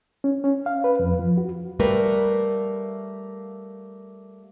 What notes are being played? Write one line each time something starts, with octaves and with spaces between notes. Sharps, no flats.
C#4
C#4
F5
B4
F2
F3
F#4
G3 A3 A#3 A#4 B4